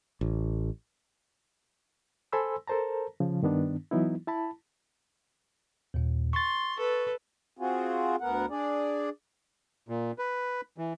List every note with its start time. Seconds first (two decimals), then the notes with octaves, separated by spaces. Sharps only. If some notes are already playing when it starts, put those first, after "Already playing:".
0.21 A1
2.32 A4 C5 G#5 B5 C6 E6
2.67 A4 A#4 C5 A5 A#5
3.20 C#3 F3
3.42 G2 D#3 B3 D4
3.91 E3 F#3 B3 D#4 E4
4.27 E4 A5 B5
5.94 D#2 A#2
6.33 C6 C#6 A6
6.77 A4 B4
7.58 C4 F4 F#4 G#4
8.21 D2 B3 A#4 F#5
8.50 D4 G#4 D5
9.89 A#2
10.18 B4
10.78 E3